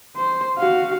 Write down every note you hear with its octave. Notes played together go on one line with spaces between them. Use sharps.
C5
F#4 F5